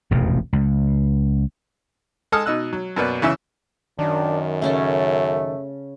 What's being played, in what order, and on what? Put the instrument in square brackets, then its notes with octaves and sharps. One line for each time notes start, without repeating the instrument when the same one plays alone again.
[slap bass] E1 A1 F2 C3
C#2
[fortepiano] G#3 A4 A5 D#6 F6
B2 D#4 D#5 E6 F#6
F#3
F#2 B2 A#3 B4 D5
C#3 E3 C#4 E5 E6
[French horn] F#2 [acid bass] D#3 [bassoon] D4
[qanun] C#3 C#4 A4 [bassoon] A3